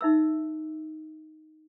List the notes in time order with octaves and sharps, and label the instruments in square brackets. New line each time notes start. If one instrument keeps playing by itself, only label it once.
[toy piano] D#4 E5 E6